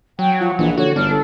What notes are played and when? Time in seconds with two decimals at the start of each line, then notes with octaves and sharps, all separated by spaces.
0.19 F#3 G5
0.41 F3 F#5
0.59 A#1 E3
0.77 D3 F#4 C#5
0.96 G1 D4 F6
1.10 A4